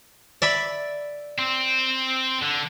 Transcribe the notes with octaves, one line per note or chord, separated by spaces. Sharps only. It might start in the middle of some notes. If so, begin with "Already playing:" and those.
D5 E5 B5
C4
D3